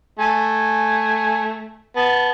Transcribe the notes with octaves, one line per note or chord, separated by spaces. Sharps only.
A3 G#5
B3 A5